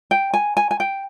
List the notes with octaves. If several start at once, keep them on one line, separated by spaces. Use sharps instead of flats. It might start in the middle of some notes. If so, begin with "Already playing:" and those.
G5
G#5
G#5
G#5
G5